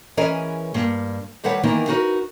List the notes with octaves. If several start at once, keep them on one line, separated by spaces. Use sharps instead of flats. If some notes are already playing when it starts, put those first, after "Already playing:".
E3 C#4 G#4 A#4 B4 D#5
G2 A#3
D#3 G3 A4 B4 C#5 F#5
D#3 E3 A#3 B3 D#4
D#4 F#4 A#4 B4